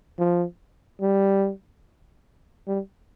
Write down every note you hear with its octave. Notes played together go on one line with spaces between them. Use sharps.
F3
G3
G3